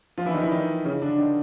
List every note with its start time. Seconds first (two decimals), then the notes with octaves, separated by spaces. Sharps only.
0.18 F3 F4
0.26 E3 E4
0.34 D#3 D#4
0.42 E3 E4
0.51 D#3 D#4
0.85 C#3 C#4
1.02 D3 D4
1.18 D#3 D#4